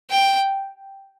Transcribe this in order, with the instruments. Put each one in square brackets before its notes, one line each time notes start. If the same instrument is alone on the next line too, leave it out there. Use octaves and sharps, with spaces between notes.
[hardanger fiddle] G5